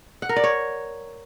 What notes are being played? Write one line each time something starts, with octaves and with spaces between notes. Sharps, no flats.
F#5
A#4
D5
C#5